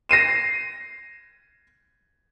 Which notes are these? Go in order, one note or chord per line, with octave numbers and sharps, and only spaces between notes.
A#6 C7 D#7 E7